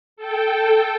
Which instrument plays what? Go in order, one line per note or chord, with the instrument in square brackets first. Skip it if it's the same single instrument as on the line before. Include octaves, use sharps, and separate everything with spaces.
[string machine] A4 G5